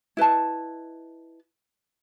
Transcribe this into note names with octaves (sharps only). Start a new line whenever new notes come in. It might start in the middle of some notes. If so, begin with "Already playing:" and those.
E4 B4 D#5 A5